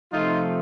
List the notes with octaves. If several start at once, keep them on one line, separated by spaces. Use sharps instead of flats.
C3 F3 A3 D#4 F4